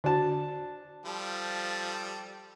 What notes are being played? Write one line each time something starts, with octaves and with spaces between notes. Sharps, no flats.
D3 D4 F#4 A5
F3 G3 A4